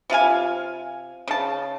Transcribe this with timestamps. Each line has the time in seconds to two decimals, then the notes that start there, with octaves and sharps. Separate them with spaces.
0.10 C3 F4 F5 G#5
1.28 C#3 A5